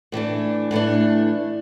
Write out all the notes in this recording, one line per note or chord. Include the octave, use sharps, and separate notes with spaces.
A2 E3 A3 D4
A2 E3 A3 D4